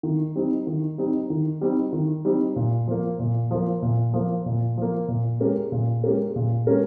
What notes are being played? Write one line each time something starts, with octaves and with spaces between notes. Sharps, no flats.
D#3
G3 C4 D#4
D#3
G3 C4 D#4
D#3
G3 C4 D#4
D#3
G3 C4 D#4
A#2
F3 A#3
A#2
F3 A#3
A#2
F3 A#3
A#2
F3 A#3
A#2
G#3 C#4 G4 A#4
A#2
G#3 C#4 G4 A#4
A#2
G#3 C#4 G4 A#4